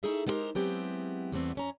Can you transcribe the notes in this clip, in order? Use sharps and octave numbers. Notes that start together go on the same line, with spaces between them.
A3 D#4 E4 G#4 A4 E5
G#3 B3 D#4 G4 A#4 C5
F#3 G#3 B3 C4 E4 G4
E2 G3 A3 B3 C4
F2 C#4 A#5